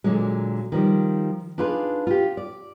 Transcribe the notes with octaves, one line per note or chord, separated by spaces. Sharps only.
A#2 D3 F#3 G#3
D#3 F3 G3
D4 D#4 F4 G#4 B4
F4 G4
D5